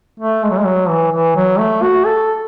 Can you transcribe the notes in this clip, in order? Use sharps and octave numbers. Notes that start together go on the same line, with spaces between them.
A3
G#3
F#3
G#3
F#3
E3
E3
F#3
A3
F#4
A4